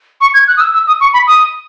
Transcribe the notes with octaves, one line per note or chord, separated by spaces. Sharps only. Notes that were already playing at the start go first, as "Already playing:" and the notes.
C#6
G#6
F#6
D#6
E6
E6
D#6
C#6
B5
D#6